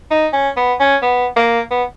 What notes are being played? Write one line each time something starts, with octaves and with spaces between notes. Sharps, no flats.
D#4
C#4
B3
C#4
B3
A#3
B3